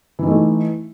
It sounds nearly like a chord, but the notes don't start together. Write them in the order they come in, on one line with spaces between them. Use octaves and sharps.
E3 D#4 A3